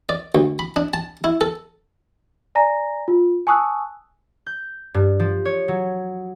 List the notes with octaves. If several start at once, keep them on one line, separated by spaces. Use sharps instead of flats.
D5
D2
B5
D4
A5
E4
A4
D5 G#5 A#5 A#6
F4
G#5 A5 C#6 D#6 E6 F#6
G6
G2
F3
C#5
F#3